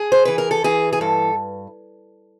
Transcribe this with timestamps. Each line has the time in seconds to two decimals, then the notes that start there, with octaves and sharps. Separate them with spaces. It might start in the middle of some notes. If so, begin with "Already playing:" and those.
Already playing: G#4
0.12 C5
0.25 E3 B4
0.38 A#4
0.51 A4
0.64 E3 G#4
0.93 G#4
1.01 G2 A4